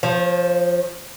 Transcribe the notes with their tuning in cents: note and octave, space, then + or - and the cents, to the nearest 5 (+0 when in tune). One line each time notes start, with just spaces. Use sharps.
F3 +0 C#5 -40